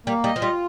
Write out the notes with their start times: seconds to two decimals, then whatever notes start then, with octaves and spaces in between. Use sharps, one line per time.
0.06 G3 A#3
0.24 G3 D#5
0.36 F3
0.41 G3 F4